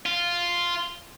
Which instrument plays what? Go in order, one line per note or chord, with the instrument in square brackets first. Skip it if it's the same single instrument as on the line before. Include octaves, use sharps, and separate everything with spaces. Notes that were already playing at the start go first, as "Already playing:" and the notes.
[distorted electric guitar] F4